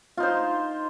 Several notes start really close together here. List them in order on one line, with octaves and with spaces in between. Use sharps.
F4 D#4 C5